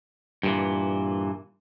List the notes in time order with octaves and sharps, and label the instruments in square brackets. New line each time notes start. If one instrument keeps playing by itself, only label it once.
[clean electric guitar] G2 A#2 E3